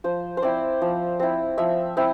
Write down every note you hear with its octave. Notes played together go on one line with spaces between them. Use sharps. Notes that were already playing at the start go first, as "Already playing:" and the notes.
F3 C5
C5
C4 E4 D5
F3
C4 E4
F3 E5
C4 E4